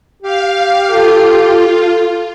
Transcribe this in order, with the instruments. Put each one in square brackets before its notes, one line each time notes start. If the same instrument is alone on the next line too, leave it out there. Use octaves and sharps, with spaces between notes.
[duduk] G4 [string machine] F5
[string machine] F4 [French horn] A4